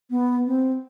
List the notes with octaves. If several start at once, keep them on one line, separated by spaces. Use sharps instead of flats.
B3
C4